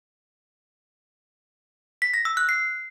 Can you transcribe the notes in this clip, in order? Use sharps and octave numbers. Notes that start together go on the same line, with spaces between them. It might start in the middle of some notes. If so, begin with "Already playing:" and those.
B6
A#6
E6
F#6
C7